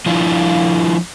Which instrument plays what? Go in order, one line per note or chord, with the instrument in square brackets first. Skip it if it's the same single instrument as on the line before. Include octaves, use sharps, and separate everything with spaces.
[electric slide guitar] F3 D4 E4 F4